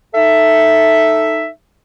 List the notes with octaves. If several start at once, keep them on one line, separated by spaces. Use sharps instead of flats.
D#4 A4 E5